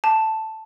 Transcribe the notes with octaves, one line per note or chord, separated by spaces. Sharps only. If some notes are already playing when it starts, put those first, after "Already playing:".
A5